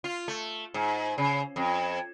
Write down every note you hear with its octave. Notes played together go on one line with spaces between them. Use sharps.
F4
A3
G#2
C#3
F2